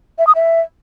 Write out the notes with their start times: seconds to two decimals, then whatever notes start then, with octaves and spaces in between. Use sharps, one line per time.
0.19 E5
0.27 D#6
0.35 E5